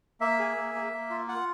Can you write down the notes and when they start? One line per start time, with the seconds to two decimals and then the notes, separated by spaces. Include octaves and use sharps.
0.21 A#3 E5
0.39 G#4
0.57 A#3
0.75 A#3
0.93 A#3
1.10 F4
1.27 F4 F#5